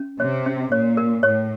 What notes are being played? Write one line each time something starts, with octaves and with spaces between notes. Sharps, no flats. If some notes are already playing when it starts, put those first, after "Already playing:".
Already playing: C#4
C3 C#5
C#4
A#2 C#5
A#4
A2 C#5